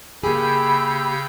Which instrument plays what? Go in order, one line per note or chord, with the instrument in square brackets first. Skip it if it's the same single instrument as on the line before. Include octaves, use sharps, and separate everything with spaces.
[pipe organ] C#3 E6 G6 [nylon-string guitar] A#3 G#4 [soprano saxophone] G4 [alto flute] B5